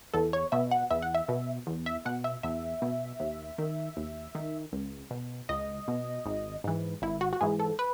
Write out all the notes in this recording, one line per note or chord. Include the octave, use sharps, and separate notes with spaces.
E2 A4
C#5
B2 E5
F#5
E2 E5
F#5
E5
B2
E2
E5
B2 F#5
E5
E2 E5
B2
D#2
D#3
D#2
D#3
C#2
B2
C#2 D#5
B2
G#1
G#2 E3
G#1 E4
F#4
F#4
G#2 E3 G#4
A4
B4